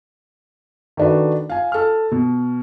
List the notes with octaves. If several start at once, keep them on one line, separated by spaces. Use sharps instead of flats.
D#3 A3 D4 F#4 B4
F5 G#5
A4 F6
B2